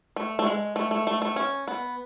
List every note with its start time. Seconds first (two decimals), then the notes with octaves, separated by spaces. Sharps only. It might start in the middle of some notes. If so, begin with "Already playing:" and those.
0.16 A3
0.39 A3
0.46 G#3
0.76 A3
0.91 A3
1.07 A3
1.22 A3
1.36 C#4
1.68 B3